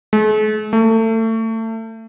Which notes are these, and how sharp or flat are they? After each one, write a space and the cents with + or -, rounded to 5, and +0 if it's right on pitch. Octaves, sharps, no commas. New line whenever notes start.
A3 -45
A3 +30